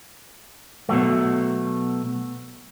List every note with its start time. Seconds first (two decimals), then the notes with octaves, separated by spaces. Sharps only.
0.89 B2 F#3 A3